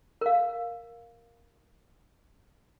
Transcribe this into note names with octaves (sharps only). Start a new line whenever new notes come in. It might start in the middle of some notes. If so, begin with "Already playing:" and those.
A#4 F5